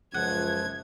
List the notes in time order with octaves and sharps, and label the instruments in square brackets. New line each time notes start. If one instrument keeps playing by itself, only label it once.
[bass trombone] C#2 [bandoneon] F#2 F3 [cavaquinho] F#5 [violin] G#6